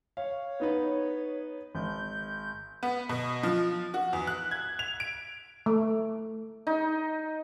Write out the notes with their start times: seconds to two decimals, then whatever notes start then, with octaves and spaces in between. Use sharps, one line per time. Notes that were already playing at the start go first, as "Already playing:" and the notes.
0.17 C#5 F5
0.60 B3 D#4 B4
1.75 G#1 G6
2.83 B3
3.09 B2
3.43 F3
3.94 F#4
4.13 E2
4.27 F#6
4.51 G#6
4.79 F7
5.00 D7
5.66 A3
6.67 D#4